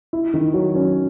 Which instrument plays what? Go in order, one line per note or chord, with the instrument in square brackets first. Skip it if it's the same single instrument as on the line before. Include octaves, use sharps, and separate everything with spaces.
[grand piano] E4
D#3
F#3
C#4